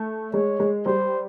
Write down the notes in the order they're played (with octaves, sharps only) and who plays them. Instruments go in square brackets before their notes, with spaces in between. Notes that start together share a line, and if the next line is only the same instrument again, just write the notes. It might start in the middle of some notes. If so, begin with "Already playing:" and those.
Already playing: [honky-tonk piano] A3
[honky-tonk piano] G#3 [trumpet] C#5
[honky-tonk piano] G#3
[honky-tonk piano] G3 [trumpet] C5